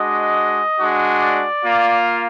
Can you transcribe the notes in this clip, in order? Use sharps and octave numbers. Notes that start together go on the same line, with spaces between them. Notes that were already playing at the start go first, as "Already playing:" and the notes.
Already playing: G#3 D4 F#4 D#5
G#3 D4 F#4
D5
A#3 F4